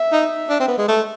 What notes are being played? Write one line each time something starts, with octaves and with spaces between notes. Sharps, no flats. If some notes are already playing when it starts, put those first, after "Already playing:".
Already playing: E5
D#4
D4
C4
B3
G#3
A3